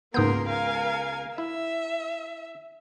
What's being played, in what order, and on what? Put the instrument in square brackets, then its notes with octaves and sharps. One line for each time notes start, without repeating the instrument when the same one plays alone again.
[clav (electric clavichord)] C#2 B3 [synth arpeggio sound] G#2 D#6 G6 [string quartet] A#3 A#4 C6
[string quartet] A#4 F5 G#5
[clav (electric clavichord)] E4 [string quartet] E5